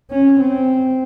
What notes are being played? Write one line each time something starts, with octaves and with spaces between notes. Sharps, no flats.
C#4
C4